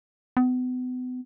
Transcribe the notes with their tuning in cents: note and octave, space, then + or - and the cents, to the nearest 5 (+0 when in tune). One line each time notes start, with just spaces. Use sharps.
B3 +35